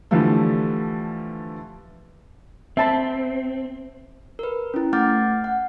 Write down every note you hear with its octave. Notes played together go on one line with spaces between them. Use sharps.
D3 E3 F3 G3 A3
C4 E5 A5 B5
A#4 B4
C#4 E4
A3 F#5 D6 F6 G6 A6
F#5